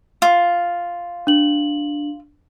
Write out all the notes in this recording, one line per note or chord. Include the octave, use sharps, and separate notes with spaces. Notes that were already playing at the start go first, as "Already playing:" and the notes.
F4
D4 F#7